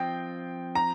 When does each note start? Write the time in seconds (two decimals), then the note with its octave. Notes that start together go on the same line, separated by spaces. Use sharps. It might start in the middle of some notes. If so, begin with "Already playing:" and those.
Already playing: F3 C4 F4 D#5 G5
0.75 A#5